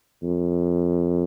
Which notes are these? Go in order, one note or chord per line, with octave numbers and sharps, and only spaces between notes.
F2